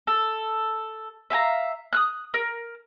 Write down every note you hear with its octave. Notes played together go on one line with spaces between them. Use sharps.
A4
E5 F5 G#5 A#5
D#6 F6 F#6
A#4